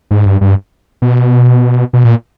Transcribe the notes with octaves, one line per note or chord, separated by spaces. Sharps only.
G#2
G2
G2
B2
B2
A#2